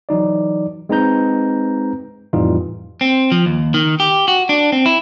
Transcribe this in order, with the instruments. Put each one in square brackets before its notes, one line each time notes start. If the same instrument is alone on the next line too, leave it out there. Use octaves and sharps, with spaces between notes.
[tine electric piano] E3 F#3 D#4 D5
G#3 C4 D#4 B4 A#5 G6
F2 A2 E3 G3 D#4 F4
[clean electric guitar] C4
F3
D#2
D#3
G4
F#4
D4
C4
E4